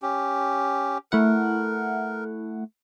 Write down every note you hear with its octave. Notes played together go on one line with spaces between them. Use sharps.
C#4 G4
A3 E4 A#4 F#5